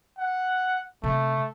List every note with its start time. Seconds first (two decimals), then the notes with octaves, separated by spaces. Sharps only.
0.19 F#5
1.04 C3 A3